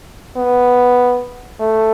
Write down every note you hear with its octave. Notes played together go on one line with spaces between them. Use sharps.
B3
A3